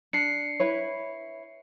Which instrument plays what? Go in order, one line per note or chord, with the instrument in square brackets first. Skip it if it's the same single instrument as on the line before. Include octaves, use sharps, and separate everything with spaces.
[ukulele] D4 [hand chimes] C7 C#7
[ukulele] E4 B4 C#5